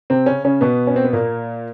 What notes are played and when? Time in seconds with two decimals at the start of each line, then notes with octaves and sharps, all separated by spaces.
0.10 C3 C4
0.26 C#3 C#4
0.44 C#3 C#4
0.61 B2 B3
0.87 C#4
0.96 C4
1.04 B3
1.13 A#2 A#3